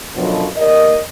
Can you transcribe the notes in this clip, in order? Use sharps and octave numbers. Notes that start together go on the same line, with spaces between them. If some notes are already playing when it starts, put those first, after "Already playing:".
F#2 B2 D3 F3 F#3
D#2 A#4 D5 D#5